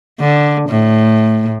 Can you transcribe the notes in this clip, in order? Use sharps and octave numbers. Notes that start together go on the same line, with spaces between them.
D3
A2